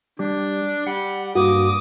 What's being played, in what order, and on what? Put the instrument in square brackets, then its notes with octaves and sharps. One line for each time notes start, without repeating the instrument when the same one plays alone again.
[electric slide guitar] G3 G4 [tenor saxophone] D4
[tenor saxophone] G3 [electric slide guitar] F#5
[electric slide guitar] G2 [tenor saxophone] A#3 [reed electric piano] F#4 [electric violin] D6 D#6